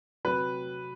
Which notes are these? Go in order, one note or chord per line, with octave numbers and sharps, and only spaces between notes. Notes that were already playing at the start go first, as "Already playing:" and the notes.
C3 F#3 B4